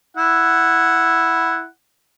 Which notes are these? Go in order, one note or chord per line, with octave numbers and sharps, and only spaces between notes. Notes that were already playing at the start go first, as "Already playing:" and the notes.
E4 F#5